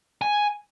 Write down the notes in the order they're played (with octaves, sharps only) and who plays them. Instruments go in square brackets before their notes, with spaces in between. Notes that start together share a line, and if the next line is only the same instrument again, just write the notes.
[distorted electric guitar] G#5